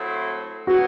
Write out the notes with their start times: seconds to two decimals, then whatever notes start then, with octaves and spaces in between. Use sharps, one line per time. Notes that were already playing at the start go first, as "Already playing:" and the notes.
Already playing: A2 F#3 C4 E4 A4
0.67 A2 F#3 B3 F#4